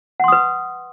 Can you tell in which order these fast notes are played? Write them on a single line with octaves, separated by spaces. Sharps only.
F#5 C6 D#6 B4